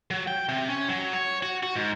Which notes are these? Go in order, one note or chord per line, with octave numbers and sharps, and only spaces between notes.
F#3
G5
C3
C#4
F#3
C#5
F#4
F#4
G#2